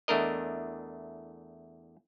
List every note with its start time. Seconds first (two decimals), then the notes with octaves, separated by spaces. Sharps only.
0.08 E2 A3 D4 A#4 D#5